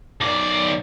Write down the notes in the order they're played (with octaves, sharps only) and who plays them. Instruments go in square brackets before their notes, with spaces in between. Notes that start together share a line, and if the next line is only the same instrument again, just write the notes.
[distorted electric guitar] B1 D5